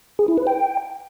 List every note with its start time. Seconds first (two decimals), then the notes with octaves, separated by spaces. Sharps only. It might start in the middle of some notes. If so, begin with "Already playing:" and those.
0.19 G#4
0.28 E4
0.38 B4
0.47 G5